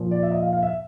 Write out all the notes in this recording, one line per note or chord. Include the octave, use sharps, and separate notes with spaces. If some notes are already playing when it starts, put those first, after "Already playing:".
Already playing: A#2 F3
D5
E5
D#5
F5
F5
E5